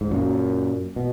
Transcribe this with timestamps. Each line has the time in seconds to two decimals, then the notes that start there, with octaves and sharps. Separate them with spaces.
0.01 G#2
0.11 F#2 A#2
0.96 B2